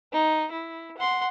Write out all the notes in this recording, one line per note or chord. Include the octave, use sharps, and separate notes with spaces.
D#4
E4
F#5 C6